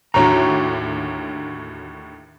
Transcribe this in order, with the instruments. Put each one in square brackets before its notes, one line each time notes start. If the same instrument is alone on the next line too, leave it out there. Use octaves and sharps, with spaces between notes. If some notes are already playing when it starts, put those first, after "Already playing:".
[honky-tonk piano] D#2 A2 D3 [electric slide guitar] F#4 C#5 A#5